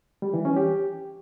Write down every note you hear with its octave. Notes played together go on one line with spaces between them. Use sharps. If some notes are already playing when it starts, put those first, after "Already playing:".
G3
E3
C#4
G4